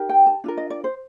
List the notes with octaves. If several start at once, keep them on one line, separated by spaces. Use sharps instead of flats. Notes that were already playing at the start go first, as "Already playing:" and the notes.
Already playing: D#4 G4 A#4
G5
A5
D4 F4 A#4
D#5
D5
C5